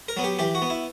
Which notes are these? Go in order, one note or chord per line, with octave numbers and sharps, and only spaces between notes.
A#4
F#3 B3
G4
E3 G4
F#4
B3
E4